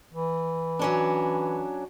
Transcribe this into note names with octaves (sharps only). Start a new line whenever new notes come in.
E3
F#3 C#4 D4